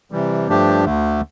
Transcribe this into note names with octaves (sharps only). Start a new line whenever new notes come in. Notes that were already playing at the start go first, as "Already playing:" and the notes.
C3 E3 G3
G2 F3 A3 D4 G4
D2 D3 A3